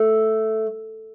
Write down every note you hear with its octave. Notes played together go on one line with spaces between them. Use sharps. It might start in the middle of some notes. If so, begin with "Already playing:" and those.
Already playing: A3